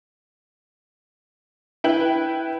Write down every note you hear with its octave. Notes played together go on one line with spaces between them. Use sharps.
E4 B4 G5 F#7